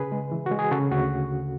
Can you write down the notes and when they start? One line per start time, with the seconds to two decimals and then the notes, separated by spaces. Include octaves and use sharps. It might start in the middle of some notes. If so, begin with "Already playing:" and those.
Already playing: C#3 G#4 B4
0.12 G#3
0.32 E3
0.46 F#4
0.52 G#3
0.59 G#4
0.71 C#3 F#4 A4
0.91 D2 F#4